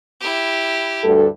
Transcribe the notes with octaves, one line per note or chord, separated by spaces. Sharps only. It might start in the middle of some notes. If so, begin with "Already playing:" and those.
E4 G4
D2 G2 A4